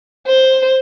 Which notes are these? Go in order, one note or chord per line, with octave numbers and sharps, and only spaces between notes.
C5